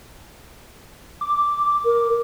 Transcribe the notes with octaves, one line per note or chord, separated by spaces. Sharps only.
D6
A#4